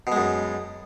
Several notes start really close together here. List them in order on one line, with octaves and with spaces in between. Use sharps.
B2 G#3 F#2